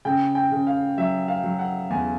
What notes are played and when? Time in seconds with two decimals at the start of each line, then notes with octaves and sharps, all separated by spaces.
0.05 C#3 G5
0.35 G5
0.52 C#3
0.67 F5
0.98 F#3 E5
1.28 F5
1.44 F#3
1.59 F#5
1.90 E2 G#5